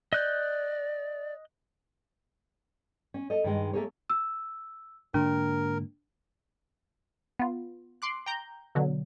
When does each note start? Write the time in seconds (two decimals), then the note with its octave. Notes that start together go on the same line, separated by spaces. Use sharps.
0.13 D5 D#5 F#6 G6
3.14 C#4
3.30 A4 C#5 D#5
3.44 G2 D#3 G#3
3.73 A3 A#3 C4 G#4 A#4 C#5
4.10 E6
5.14 G#2 D3 A#3 D4 A#4
7.39 B3 F4
8.02 C6 D6 F#6
8.26 G5 A#5 G6
8.75 B2 D3 F#3